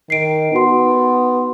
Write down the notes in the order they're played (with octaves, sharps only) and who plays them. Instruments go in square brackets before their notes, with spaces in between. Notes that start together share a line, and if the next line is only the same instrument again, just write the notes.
[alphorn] D#3 [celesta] C7 D7
[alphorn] B3 [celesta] D#4 F#4 C6